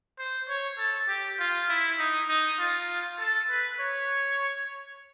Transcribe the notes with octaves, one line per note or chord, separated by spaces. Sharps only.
C5
C#5
A4
G4
F4
E4
D#4
D#4
F4
A4
B4
C#5